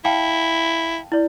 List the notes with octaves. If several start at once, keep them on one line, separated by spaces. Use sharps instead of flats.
E4 F5 G5 A5
E4 D5